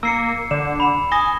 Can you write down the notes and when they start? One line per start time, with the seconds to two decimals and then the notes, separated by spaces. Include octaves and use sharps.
0.03 A#3 E6 C7 C#7
0.51 D3 E7
0.80 B5 E7
1.12 G#5 D#6 A#6 G7